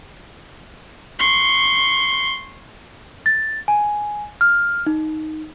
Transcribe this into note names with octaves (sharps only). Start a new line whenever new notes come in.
C6 C#6
A6
G#5
F6
D#4